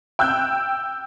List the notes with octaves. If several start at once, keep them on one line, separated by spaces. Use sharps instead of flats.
G5 E6 F#6 G6